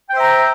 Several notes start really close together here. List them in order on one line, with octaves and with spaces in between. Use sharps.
G5 C5 E5 A#5